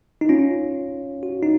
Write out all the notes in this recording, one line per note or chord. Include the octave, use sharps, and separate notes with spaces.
D#4
C#4 F4
F#4
D#4